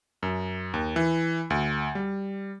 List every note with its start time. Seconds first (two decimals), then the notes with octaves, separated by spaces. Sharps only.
0.23 F#2
0.74 D#2
0.96 E3
1.50 D2
1.95 G3